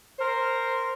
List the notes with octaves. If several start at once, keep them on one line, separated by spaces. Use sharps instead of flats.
A#4 C5